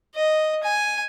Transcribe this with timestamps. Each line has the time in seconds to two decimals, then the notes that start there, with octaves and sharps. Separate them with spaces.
0.15 D#5
0.63 G#5